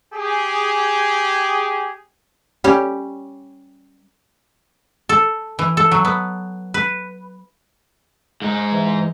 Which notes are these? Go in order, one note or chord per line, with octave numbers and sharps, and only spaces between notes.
G4 G#4
G3 C#4 G4
A4
E3
A4
F#3
B3
B4
G#2 D#4
E3